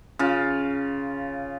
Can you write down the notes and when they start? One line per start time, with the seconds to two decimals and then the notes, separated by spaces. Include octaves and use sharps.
0.19 C#3 F4